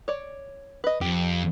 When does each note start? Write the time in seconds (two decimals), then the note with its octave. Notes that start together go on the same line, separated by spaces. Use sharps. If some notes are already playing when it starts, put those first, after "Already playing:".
0.08 C#5 D5
0.84 B4 D#5
1.01 F2 G4